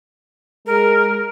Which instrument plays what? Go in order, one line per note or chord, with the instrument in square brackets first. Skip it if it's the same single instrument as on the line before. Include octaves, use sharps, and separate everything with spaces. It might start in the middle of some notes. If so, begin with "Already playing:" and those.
[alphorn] G#3 [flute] A#4